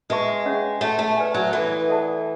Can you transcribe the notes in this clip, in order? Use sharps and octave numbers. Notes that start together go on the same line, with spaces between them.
G#3 B4 E5 A5 C#6
C#4 G#4 C#5 F#5 C#6
A3 F#4 C#5 F#5 A5
A3
B4 D5 G#5
F#3
E3 F#4 A4 E5 B5
A4 D5 F#5 A5